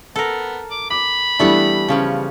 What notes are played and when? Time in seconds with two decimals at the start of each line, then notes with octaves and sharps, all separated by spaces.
0.16 B3 A4 A#4
0.71 D6
0.90 B5 D6
1.39 E3 G3 A3 B3 D4 F#5
1.88 C#3 F3 C#4